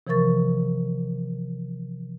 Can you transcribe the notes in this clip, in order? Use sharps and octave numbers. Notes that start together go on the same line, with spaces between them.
C3 E3 F3 A#4 C#6 A6